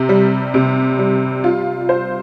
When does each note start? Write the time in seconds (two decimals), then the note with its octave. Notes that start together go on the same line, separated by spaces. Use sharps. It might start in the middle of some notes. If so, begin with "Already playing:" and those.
Already playing: C3
0.09 G3
0.54 C3
0.99 G3
1.44 F4
1.89 C5